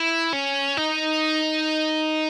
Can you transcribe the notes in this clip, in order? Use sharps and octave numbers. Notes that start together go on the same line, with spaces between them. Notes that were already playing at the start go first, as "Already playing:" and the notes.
Already playing: E4
C#4
D#4